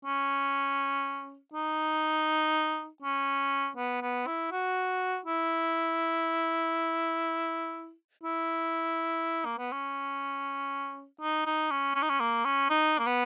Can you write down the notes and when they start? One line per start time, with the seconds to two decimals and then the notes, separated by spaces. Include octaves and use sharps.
0.05 C#4
1.54 D#4
3.02 C#4
3.77 B3
4.02 B3
4.27 E4
4.52 F#4
5.25 E4
8.24 E4
9.45 A#3
9.58 B3
9.72 C#4
11.21 D#4
11.46 D#4
11.71 C#4
11.95 C#4
12.02 D#4
12.09 C#4
12.20 A#3
12.45 C#4
12.70 D#4
12.98 A#3
13.06 B3